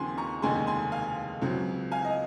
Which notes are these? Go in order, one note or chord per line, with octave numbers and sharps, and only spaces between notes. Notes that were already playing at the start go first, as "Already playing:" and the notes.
Already playing: D#2 C#3 F3 C4 D#4 G#5 C6
A#5 C#6
F1 D#2 C#3 G#3 G#5 C6
G#5 C6
F5 G#5
C#2 C#3 F#3 C4
F5 G#5
D#5